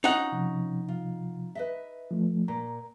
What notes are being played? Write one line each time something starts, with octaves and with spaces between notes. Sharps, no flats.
C#4 D#4 F4 F#4 F#5
C3 F3
F4
B4 D#5 E5
F3 A3
A#2 A#5